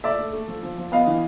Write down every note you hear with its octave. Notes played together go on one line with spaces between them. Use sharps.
A3 D5 E5
A3
A3
F3
F3
F3
B3 D#5 F5
E3